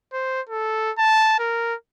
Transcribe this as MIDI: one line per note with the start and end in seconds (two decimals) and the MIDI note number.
0.13 0.41 72
0.49 0.91 69
0.98 1.36 81
1.39 1.75 70